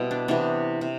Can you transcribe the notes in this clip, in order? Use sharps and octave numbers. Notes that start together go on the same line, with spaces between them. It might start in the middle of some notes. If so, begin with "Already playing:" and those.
Already playing: B2 G3 C4 E4
D4
C3 E3 B3 D4
C3